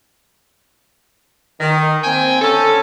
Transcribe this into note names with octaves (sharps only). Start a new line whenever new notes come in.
D#3
A#3 C4 G5 G#5
D3 C#4 A4